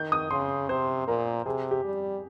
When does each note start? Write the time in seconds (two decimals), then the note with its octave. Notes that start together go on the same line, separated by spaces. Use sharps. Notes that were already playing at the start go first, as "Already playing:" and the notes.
Already playing: D#3 G6
0.12 D#6
0.31 C#3 C6
0.69 C3 C5
1.07 A#2 A#4
1.46 C3 G#4
1.71 G4
1.84 G3